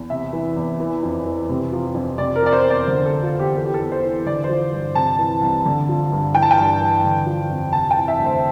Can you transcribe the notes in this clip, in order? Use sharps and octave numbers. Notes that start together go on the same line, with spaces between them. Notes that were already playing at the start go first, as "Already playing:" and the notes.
Already playing: E2
C3 E5
E3
E2
E3
F2
E3
C3
F3
F2
C3 D5
A#4
F3 D5
C5
E2
D5
D3 C5
F3 A4
F4
E2
G4
E3 A4
G4
A4
E2
C5
E3
D3 D5
C5
F3
G2
C3 A5
E3
C2
D3
F3
G2
E3 G5
A5
G5
G2
E3
D3
F3
F2
C3 A5
G5
E3
E5
D2
C5